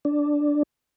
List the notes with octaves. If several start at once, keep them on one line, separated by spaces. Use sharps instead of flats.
D4